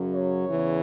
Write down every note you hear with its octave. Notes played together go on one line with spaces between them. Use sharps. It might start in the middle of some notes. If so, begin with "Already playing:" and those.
Already playing: F#2 C#3 F#3
C#5
E2 C#3 E3